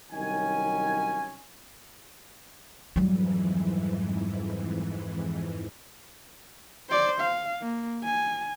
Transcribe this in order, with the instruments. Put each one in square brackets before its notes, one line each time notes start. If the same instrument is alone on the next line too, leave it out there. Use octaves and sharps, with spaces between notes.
[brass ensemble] C2 D#3 F#3 C#4 G#5
[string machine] F2 G#2 E3 [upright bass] F#3 G3
[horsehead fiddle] C5 D5
F5
A#3
G#5